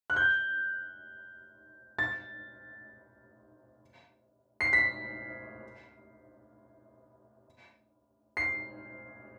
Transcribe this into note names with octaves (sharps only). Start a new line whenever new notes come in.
F#6
G6
A6
C7
B6
C7